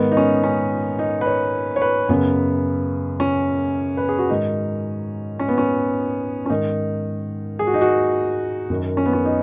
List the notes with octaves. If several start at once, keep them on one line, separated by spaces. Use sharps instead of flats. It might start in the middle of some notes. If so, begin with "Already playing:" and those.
Already playing: G#2 D#3 B3
D#4
C#4
C#4
D#4
B4
C#5
C#5
B4
F#2 C#3 B3
C#4
B4
G#4
F#4
G#2 D#3 D#4
C#4
B3
C#4
C#4
G#2 D#3 D#4
G#4
F#4
D#4
F#4
F#2 D#3
C#4
B3
C#4
D#4